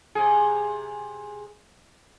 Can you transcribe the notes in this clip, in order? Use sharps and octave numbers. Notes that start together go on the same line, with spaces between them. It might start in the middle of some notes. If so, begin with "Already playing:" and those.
C3 G#4